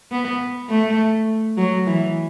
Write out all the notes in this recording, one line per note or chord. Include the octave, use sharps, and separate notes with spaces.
B3
A3
F#3
E3